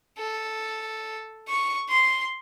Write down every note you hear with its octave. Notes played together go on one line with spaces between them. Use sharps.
A4
C#6
C6